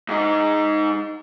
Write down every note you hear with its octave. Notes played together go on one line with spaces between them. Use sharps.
G#2 D#4